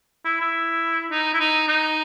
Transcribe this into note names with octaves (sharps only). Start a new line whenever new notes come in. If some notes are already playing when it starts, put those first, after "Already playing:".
E4
E4
D#4
E4
D#4
D#4